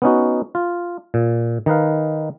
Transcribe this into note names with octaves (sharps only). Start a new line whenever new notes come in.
B3 C#4 D#4 F#4
F4
A#2
D#3 D#4 B4 F5